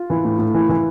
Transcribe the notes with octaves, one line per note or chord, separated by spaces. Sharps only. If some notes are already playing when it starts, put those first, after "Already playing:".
Already playing: F4
E3
A2
A2
E3
E3